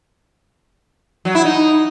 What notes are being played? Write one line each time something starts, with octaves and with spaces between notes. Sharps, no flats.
F#3
E4
D#4